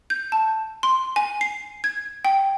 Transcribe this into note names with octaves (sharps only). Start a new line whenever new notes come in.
G6
A5
C6
G#5
C7
G#6
G5